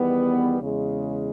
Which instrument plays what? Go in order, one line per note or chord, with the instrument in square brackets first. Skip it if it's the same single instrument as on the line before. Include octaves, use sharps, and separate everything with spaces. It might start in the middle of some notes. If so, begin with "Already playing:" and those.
Already playing: [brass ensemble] E2 D#3 G3 B3
E2 C#3 G#3